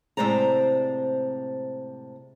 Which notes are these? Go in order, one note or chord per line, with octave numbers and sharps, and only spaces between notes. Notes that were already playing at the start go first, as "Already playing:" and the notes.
A2 C3 G#3 C5 D5 A#5